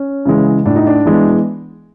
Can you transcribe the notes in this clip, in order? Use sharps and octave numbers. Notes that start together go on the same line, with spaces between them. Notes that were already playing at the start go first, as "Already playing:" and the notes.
Already playing: C#4
C#3 E3 G#3
A2 D4
D#4
D4
E3 G#3 B3